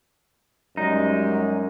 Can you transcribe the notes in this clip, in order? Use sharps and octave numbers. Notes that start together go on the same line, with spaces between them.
F#2 G3 G#3 D#4